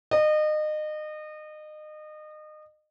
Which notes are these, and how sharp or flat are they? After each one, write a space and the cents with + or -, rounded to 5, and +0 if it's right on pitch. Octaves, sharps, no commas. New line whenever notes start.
D#5 -30